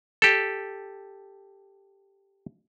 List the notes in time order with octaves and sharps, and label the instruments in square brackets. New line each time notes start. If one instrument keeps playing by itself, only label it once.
[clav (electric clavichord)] G4 A4